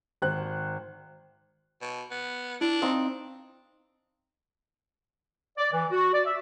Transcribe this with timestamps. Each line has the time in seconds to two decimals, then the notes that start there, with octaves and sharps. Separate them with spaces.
0.22 G#1 C5 G5 F#6
1.82 B2
2.11 B3
2.61 D4 E4
2.82 C4 D#4 F5 C6
5.58 D5
5.72 E3
5.91 F#4
6.13 D5
6.25 E5